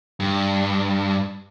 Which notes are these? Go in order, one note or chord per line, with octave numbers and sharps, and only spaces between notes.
G2